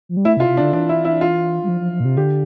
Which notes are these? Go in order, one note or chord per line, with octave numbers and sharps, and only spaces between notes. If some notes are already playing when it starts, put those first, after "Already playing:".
F3
G3
A3 E4
C3
F4
C3
D4
D3
E3 D4
E4
E4
F4
G3
F3
F3
F3
A#2
C3
D3 G4